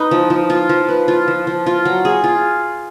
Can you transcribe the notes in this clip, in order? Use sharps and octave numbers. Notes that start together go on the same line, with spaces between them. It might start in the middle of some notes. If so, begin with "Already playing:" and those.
Already playing: D#4 B4
F3
F3
F4
F3
B4
F4
F3
F3
F4
F#3
G#4
F4